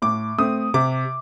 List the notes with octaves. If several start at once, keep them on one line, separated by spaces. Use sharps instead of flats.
A2 D6
A3 C4 D#6
C3 D6